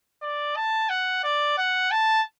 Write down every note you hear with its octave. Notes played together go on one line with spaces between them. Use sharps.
D5
A5
F#5
D5
F#5
A5